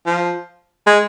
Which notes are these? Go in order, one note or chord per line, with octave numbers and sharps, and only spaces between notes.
F3
G#3